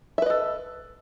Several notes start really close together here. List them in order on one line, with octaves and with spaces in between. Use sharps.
E5 B4 D#5 A4